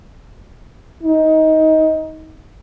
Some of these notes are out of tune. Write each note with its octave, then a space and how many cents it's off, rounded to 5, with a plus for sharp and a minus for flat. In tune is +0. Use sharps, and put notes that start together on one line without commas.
D#4 +20